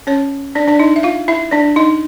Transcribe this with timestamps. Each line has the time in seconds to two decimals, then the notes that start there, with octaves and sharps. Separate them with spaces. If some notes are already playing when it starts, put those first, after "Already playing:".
0.07 C#4 C#5
0.55 D4 D5
0.68 D4 D5
0.79 D#4 D#5
0.96 E5
1.03 F4 F5
1.28 E4 E5
1.51 D4 D5
1.76 D#4 D#5